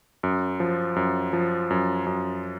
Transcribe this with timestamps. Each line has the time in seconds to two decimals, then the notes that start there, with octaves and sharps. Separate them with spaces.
0.23 F#2
0.60 F3
0.96 F#2
1.33 F3
1.70 F#2
2.06 F#2